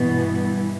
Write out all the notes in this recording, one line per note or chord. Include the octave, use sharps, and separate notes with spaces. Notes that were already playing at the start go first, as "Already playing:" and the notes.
Already playing: G2 B2 E3 B3